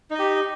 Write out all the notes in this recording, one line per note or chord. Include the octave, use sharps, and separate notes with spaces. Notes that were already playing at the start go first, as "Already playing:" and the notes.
D#4 G4 D#5